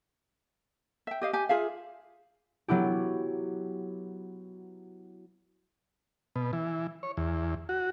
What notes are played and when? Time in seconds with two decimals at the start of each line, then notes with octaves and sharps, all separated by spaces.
1.07 E5 G5
1.22 G4 D#5 F5
1.33 G4 G#5
1.49 F4 G#4 E5 F5
2.68 F#3 B3 E4 G4
6.36 B2
6.53 E3
7.03 C#5
7.17 E2
7.69 F#4